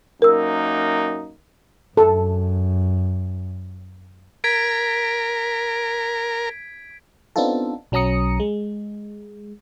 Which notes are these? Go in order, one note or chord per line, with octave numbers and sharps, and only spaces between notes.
F#2 A#3 D#4 A#4 E6
F#2 A4
A#4 G#6 B6 D7
B3 C4 D4 D#4 F4 A4
B1 F#3 C#4 A#5 D#6 C#7
G#3